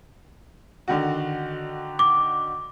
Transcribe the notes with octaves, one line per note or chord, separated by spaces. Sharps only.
D3 D#3 F#4
D6